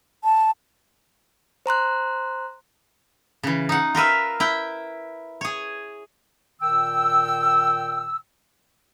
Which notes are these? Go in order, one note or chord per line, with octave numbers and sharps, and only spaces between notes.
A5
C5 A#5 C6 F#6
C#3 E3
D#4 F#5
F4 A#4 B4 E5
E4 G5
G#4 C#5
A#2 D#3 G5 E6